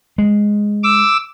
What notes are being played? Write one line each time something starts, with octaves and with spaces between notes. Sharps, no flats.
G#3
D6 E6